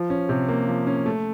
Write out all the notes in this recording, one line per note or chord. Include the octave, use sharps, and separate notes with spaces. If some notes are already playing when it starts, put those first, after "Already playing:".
Already playing: F3
C#4
C3
A#3
F3
C#4
A3